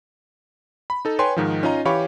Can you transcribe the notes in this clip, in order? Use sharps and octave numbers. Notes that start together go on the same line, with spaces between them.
B5
D#4 A4
B4 C#5 G5 G#5 C6
G#2 D#3 F3
C#4 D#4 F4 D#5 A#5
E3 G4 C#5 F5 B5 C#6